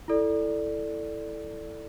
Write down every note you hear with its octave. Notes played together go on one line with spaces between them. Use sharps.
E4 A4 D5